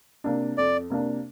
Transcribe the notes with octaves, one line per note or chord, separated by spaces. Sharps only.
C3 A#3 D4
F2 D5
C3 A#3 D4